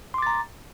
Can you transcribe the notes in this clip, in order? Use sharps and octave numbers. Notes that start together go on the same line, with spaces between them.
A#5 C6 D6 A6